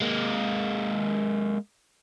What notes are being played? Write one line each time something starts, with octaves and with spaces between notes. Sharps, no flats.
G#3 A#3